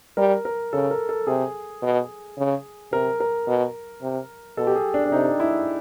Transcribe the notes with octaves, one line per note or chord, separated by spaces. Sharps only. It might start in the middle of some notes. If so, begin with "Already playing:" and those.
G3 A#4
A#4
C#3 A4
A#4
A4
C3 G#4
B2
C#3
C3 A#4
A#4
B2
C3
B2 A4
G4
G#4
D4
D4
C3 D#4
E4